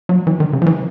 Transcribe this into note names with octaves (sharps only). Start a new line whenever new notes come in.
F#3
E3
D#3
C#3
F3
E3